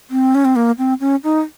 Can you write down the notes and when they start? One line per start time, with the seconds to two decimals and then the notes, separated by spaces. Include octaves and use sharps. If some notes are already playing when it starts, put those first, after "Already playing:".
0.10 C4
0.35 C#4
0.45 C4
0.56 A#3
0.78 C4
1.00 C#4
1.24 D#4